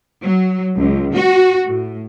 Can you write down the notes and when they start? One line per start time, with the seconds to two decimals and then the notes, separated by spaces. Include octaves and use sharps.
0.21 F#3
0.76 C#2
1.14 F#4
1.69 A2